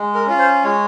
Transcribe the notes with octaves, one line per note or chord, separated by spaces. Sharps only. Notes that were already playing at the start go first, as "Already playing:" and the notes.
Already playing: G#3
A#4
C#4 F4
C5
G#3 C#5